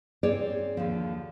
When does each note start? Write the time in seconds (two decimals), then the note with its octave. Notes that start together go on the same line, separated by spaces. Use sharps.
0.23 C4 G#4 C#5 D5
0.77 D#2 D3 F3